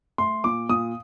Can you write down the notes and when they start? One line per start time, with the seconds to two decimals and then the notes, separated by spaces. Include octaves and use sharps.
0.18 A3 C6
0.44 A#2 D6
0.69 A#2 D#6